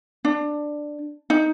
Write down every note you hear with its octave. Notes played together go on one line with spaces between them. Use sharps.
D4
D#4